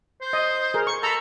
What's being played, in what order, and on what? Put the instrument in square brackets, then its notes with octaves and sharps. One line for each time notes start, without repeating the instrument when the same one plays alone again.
[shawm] C5
[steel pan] D#5
G#4 A#4
C#6
[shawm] A4 [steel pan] A#5 B5